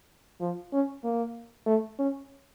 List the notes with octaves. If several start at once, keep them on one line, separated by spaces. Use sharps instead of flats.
F3
C#4
A#3
A3
C#4